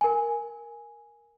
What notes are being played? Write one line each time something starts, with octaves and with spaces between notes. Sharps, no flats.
A#4 G#5